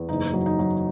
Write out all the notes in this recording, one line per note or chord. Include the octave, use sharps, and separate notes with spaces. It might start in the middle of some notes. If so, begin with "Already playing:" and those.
Already playing: E2
F#1 D#4
F#3
D#4
F#3